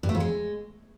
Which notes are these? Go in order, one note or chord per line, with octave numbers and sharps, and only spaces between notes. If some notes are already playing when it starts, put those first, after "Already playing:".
G2
A3
F2
G#3